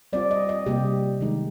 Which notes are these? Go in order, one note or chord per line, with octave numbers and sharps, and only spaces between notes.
G3 C4 F4 D5
D#5
D#5
C3 G3 A#3 G4
D#3 G#3 D#4